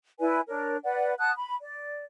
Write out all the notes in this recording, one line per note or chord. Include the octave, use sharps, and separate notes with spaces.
E4 B4 D5 G#5
D4 A#4 C#5
B4 D5 F#5
F#5 A5 D#6 F#6
B5
D5